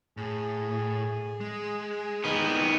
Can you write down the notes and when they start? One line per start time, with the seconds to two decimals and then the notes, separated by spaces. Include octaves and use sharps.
0.17 A2 G#4
1.41 G#3
2.24 D#3 B3